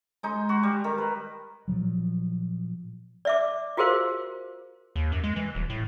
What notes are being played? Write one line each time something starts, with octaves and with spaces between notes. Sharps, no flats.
G#3 D#4
F#4
G3
D#3
B4
A#2 F3 F#3
D5 E5 D6
F4 F#4 G#4 A#4 C5 F5
D#2
F#2
G#3
E3
D#1
A2